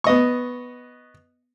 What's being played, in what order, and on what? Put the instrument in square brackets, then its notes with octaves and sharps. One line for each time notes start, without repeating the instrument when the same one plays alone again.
[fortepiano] B3 D#5 C#6